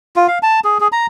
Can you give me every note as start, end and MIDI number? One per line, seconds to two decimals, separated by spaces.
0.16 0.27 65
0.28 0.39 77
0.43 0.60 81
0.64 0.78 68
0.80 0.88 68
0.92 1.07 82